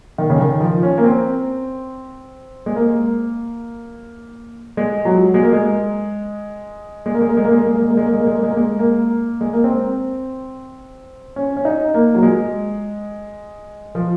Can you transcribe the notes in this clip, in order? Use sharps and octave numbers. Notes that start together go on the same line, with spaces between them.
D#3
C#3
D#3
F3
C#4
A#3
C4
G#3
A#3
G#3
F#3
G#3
A#3
G#3
G#3
A#3
G#3
A#3
G#3
A#3
G#3
A#3
G#3
A#3
G#3
A#3
G#3
A#3
G#3
A#3
G#3
A#3
G#3
A#3
G#3
A#3
G#3
A#3
C4
C#4
C#4
D#4
A#3
F#3
G#3
F3